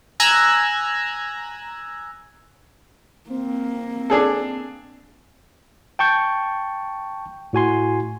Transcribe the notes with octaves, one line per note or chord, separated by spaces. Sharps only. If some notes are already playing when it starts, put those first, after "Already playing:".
G#5 A#5 E6 F#6 G#6
A#3 C4
D4 G#4 A4
G5 A5 C#6 G6
A2 F#4 G#5 C6